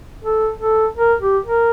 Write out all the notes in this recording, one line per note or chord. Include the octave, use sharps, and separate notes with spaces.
A4
A4
A#4
G4
A#4